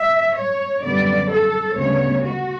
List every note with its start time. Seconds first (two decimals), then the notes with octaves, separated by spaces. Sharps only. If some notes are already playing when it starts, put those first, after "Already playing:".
Already playing: E5
0.36 C#5
0.83 F#2 D3 G3 B3 D5
1.30 A4
1.76 D2 C#3 G3 B3 C#5
2.23 F#4